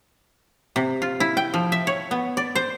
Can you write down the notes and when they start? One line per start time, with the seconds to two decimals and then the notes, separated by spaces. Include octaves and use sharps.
0.76 C3
1.02 F4
1.20 E4
1.37 G5
1.54 F3
1.72 E5
1.87 C#5
2.11 B3
2.37 D5
2.55 C5